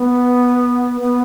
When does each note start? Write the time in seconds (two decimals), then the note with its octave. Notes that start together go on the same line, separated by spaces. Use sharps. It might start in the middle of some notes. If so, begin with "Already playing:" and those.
Already playing: B3
1.01 B3